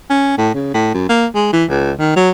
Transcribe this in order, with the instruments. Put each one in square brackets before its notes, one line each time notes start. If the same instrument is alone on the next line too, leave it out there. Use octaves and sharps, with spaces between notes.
[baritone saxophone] C#4
A2
C#3
A2
F#2
A#3
G#3
E3
C#2
D#3
F#3